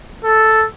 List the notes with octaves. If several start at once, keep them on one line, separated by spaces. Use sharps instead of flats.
A4